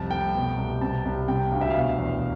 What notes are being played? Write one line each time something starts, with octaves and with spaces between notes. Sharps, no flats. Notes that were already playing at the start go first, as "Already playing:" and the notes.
Already playing: C2 F2 A5
A3 G5
B2
C2
C3 A5
C2
C3 G5
D2 F5
E5
F5
B2
E2